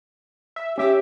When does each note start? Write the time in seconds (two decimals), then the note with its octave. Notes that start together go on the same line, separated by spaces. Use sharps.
0.56 E5
0.78 C#4 G4 E5